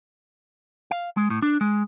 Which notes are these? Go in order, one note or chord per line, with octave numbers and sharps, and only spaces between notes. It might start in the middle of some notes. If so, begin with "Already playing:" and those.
F5
G#3
A2
D4
G#3